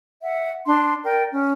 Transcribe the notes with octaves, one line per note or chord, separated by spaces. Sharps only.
E5 F#5
D4 C6
A#4 D5 G5
C#4